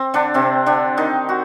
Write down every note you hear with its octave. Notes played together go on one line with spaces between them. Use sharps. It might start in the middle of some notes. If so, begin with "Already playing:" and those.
Already playing: C4
D3 D4
C3 C4
D3 D4
D#3 D#4
F#4